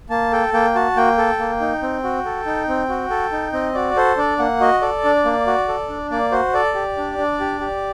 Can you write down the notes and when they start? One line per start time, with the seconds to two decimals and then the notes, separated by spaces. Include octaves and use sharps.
0.10 A#3 A5
0.32 A4 G5
0.54 A#3 G5
0.75 F#4 A5
0.97 A#3 G5
1.18 A4
1.39 A#3
1.60 D#4
1.82 C4
2.04 F#4
2.26 A4
2.46 D#4
2.68 C4
2.89 F#4
3.10 A4
3.32 D#4
3.53 C4 D#5
3.74 F#4 D5
3.97 A4 C5
4.17 D4 D5
4.39 A#3 F#5
4.61 F#4 D#5
4.82 A4 D5
5.04 D4
5.25 A#3
5.47 F#4
5.68 A4
5.89 D4
6.11 A#3 D5
6.32 F#4 C5
6.54 A4 D5
6.74 G4
6.97 D4
7.18 D4
7.40 G4
7.60 G4